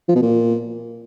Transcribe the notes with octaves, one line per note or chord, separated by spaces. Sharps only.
F3
B2
A#2